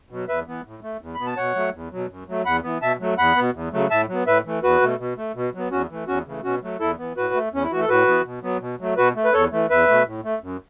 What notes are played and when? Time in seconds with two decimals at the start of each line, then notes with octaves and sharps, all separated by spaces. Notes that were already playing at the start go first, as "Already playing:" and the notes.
0.10 B2 F#3
0.29 E2 B4 E5
0.47 E3 B3
0.65 A2
0.83 A3
1.01 E2
1.15 B5
1.20 B2 B3
1.27 A5
1.37 B2 C#5 F#5
1.55 F#3 A3
1.74 E2
1.92 B2 F#3
2.09 F#2
2.28 F#3 A3
2.45 E2 F#5 B5
2.63 E3 B3
2.82 B2 E5 A5
3.00 F#3 A3
3.18 E2 F#5 B5
3.36 B2 B3
3.54 E2
3.73 C#3 F#3 A3
3.91 A2 E5 A5
4.09 F#3
4.14 B3
4.26 A2 B4 E5
4.45 E3 A3
4.63 E2 F#4 B4
4.81 B2 A3
4.99 B2
5.18 A3
5.35 B2
5.54 F#3 B3
5.71 E2 C#4 F#4
5.90 E3 A3
6.07 E2 C#4 F#4
6.26 C#3 E3 A3
6.44 B2 C#4 F#4
6.62 F#3 A3
6.80 E2 E4 A4
6.98 E3 B3
7.17 A2 F#4 B4
7.34 A3
7.52 E2 C#4
7.63 E4
7.71 E3 A3 F#4
7.81 A4
7.89 A2 F#4 B4
8.07 E3 B3
8.25 B2
8.43 F#3 B3
8.61 B2
8.80 F#3 A3
8.97 B2 F#4 B4
9.16 A3
9.25 B4
9.33 E2 A4 C#5
9.52 E3 A3
9.70 E2 B4 E5
9.88 B2 A3
10.06 A2
10.24 A3
10.42 F#2